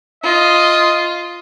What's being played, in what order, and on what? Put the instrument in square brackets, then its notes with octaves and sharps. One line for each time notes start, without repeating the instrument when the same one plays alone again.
[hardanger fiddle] F4 [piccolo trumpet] D#5